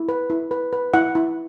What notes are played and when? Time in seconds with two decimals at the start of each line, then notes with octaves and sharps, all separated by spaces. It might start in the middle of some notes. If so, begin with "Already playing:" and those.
Already playing: E4
0.09 B4
0.30 E4
0.51 B4
0.73 B4
0.94 E4 F#5
1.15 E4